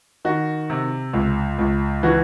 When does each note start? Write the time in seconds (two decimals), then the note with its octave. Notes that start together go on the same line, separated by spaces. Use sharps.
0.25 D#3 F#4
0.70 C3
1.13 C#2
1.59 C#2
2.03 E3 F#4